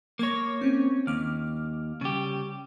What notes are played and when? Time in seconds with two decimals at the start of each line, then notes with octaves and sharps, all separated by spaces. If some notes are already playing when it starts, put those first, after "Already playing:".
0.19 A#3 C#5 D6 G#6 A#6
0.61 C4 C#4
1.07 D#2 D6 F6
2.01 C#3 G3 G4